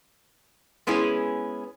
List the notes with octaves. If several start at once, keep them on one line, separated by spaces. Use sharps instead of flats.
G#3 B3 C#4 E4 G#4